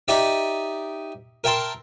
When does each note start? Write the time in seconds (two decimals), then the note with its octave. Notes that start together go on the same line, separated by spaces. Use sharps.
0.08 D#4 G4 D5 E5
1.44 A#4 E5 G5 A5 C6